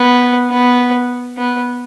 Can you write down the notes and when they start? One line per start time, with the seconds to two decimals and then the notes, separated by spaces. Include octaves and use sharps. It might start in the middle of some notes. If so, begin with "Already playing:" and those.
Already playing: B3
0.51 B3
1.37 B3